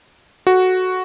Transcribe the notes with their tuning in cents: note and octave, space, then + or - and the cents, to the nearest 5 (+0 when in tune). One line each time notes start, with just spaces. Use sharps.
F#4 +0 A4 -10